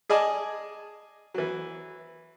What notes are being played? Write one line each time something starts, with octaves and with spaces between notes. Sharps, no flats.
G#4 D5 D#5 G#5 A5
E3 F#3